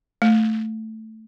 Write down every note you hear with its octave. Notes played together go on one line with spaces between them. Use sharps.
A3